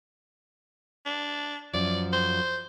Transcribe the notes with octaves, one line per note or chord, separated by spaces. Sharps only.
D4
F#2 F3 D5
C5